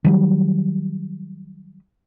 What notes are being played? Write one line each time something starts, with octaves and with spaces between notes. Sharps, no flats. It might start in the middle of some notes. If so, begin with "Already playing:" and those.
D#3 F#3 G3